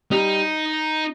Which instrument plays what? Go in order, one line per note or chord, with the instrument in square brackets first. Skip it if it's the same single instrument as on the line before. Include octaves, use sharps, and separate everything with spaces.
[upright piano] G3 [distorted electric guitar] D#4